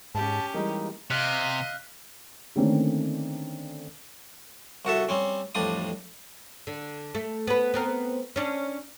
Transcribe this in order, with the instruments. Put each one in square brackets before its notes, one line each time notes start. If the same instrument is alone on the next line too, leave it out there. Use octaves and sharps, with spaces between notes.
[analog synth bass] G#2 [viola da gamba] C#4 G4 [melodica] A5
[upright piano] E3 G3 G#3 [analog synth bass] A#3 [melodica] D#4
[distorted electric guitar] C3 [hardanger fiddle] D#5 F5 [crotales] F6 F#6 B6
[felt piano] D3 D#3 A3 A#3 C4 C#4
[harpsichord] C2 F#4 A4 E5
G3 C4 C#4
A1 F2 G3 D4 D#6
[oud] D3
A3
B3 B4
B3 C4 A#4
C#4 D4